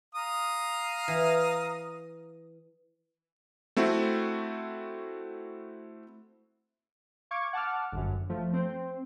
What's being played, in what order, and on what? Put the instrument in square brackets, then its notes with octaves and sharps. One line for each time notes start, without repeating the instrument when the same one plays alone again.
[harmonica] F5 A#5 D#6
[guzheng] E3
[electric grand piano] A3 C4 E4 F#4
[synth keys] F5 C#6 D6 G#6
F#5 A5 D6 F6
G1 F#2
F3 A3
C4 C5